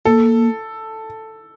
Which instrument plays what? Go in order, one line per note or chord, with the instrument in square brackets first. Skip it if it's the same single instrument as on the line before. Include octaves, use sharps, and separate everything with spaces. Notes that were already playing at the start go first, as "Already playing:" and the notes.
[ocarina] A#3 [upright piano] A4